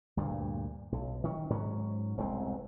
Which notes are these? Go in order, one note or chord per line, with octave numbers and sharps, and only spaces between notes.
D2 G2 A#2
B1
D#3 C#4
G#2 F#3 C#4
E1 C2 G#3 C4